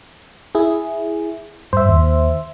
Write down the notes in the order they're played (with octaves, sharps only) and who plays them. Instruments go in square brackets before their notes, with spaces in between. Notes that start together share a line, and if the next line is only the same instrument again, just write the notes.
[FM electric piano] E4 G#4
[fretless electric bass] G2 [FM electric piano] C5 E5
[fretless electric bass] D#2